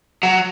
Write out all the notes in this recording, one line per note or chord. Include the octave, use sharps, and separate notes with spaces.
F#3